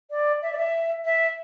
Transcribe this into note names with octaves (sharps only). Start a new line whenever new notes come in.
D5
E5
D5
E5
E5